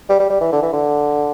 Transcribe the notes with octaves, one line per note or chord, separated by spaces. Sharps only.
G3
G3
G3
E3
D3
E3
D3